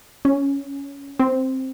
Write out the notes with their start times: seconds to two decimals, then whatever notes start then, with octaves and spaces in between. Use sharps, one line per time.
0.25 C#4
1.19 C4